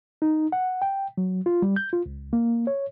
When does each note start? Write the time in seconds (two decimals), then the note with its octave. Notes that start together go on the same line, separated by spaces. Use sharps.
0.22 D#4
0.52 F#5
0.82 G5
1.18 F#3
1.46 F4
1.62 G3
1.76 G6
1.93 F4
2.06 C#2
2.33 A#3
2.67 C#5